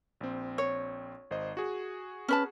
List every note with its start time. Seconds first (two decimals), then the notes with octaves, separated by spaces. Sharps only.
0.21 A#1 C4
0.58 C#5
1.31 G#1 C5 D#5
1.57 F#4 G#4
2.28 C#4 B4 A5